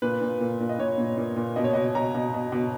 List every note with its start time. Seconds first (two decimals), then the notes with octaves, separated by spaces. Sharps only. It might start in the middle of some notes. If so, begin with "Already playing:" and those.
0.02 A#2 B4
0.21 A#2
0.41 A#2
0.60 A#2
0.69 D#5
0.79 A#2 C#5
0.98 A#2
1.17 A#2
1.36 A#2
1.56 B2 D#5
1.64 C#5
1.73 B2 D#5
1.95 B2 A#5
2.14 B2
2.34 B2
2.52 B2